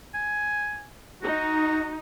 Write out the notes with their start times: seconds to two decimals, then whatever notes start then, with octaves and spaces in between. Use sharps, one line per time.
0.14 G#5
1.22 D#4 F#4